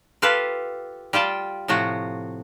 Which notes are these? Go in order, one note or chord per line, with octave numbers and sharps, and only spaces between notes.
F4 G4 A4 B4 F5
G3 F4 G5 A5
A2 C3 F3 F#4